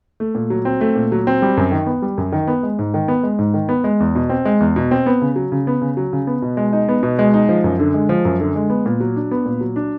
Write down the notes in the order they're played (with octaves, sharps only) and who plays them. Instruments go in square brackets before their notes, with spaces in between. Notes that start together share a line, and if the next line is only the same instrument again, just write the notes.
[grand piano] A3
A#2
F#3
C4
A3
A#2
F#3
C4
G3
F#2
D#3
B3
G3
F#2
D#3
B3
G#3
G#2
D#3
B3
G#3
G#2
D#3
B3
G#3
E2
B2
C4
G#3
E2
B2
C4
B3
C#3
F#3
C#3
B3
C#3
F#3
C#3
B3
B2
G#3
D#4
B3
B2
G#3
D#4
F3
F#2
D3
G#3
F3
F#2
D3
G#3
B3
A#2
F#3
D4
B3
A#2
F#3
D4